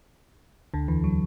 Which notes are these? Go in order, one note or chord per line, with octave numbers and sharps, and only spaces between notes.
D2 D3
E2 E3
F#3